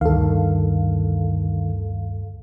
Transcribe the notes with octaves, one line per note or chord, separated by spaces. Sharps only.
D2 G2 D#3 A4 F5